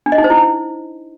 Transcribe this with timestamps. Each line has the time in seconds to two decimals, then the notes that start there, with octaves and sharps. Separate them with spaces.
0.06 D4
0.12 D#5
0.18 D#4
0.24 C5
0.30 E4